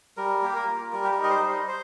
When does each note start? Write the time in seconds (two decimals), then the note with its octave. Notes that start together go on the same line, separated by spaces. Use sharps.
0.17 G3 A#4
0.43 A#3 G4
0.56 A#4
0.67 F4
0.92 G3 A#4
1.04 G4
1.12 A#4
1.17 D#4
1.24 D#5
1.30 C5
1.43 G3
1.49 D#5
1.68 C5